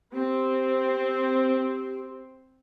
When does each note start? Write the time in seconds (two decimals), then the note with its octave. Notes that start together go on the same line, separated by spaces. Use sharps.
0.12 C4 G4